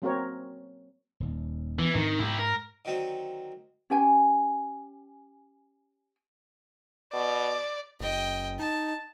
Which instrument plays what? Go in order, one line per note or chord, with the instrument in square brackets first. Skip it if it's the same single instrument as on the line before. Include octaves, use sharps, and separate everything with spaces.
[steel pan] F#3 A#3 C4 F#4 A#4 C#5
[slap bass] D#1 D#2
[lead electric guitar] E3 [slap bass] B3
[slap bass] G#2 C4 D4 [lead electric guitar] D#3
[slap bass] G#2 [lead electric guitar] E4 G4
[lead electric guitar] A#4
[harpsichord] D3 D#3 F#3 C4
[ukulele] C#4 G4 G5 G#5
[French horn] B2 [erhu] D5
[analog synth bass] F#1 [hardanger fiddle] D#5 G5
[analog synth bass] D#4 [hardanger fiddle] A5